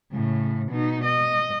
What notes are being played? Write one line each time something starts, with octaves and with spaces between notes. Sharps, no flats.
A2 C#3
B2 D#4
D#5